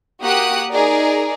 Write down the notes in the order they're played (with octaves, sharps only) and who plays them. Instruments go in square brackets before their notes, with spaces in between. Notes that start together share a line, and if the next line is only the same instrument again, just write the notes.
[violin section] A#3 F#4 G4 F#5 D#6 F#6
D#4 G#4 A#4 D5